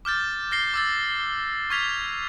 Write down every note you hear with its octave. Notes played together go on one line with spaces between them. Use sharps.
D6 F6 G6 A6
F6 A#6 C7 G7
D6 E6 A6
C#6 F6 G#6 B6 F7